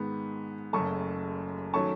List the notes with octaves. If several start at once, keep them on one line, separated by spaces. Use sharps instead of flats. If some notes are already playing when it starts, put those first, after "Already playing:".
Already playing: G#2 D#3 G#3 B3 B5
F#1 F#2 C#3 F#3 A3 A5 C#6
D#3 F#3 A3 C#4 A5 C#6